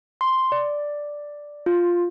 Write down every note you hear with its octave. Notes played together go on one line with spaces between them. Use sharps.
C6
D5
F4